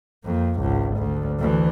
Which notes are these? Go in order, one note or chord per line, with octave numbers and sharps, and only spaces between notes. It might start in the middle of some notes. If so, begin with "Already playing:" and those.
F2 A#3
G#1 C#2
D2
D2 E3